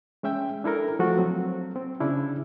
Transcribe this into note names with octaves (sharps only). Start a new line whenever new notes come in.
G#3 C#4 E5 G5
D4 E4 A4 A#4
F3 A3 F4 F#4 A4
F#3 C4
C4
C#3 C#4 D4 E4